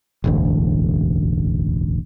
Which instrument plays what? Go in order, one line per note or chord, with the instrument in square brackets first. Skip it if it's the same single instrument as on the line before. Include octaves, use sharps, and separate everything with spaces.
[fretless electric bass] E1 A1 D2